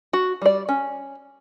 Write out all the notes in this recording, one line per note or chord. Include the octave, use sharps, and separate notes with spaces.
F#4
G3 D5
C#4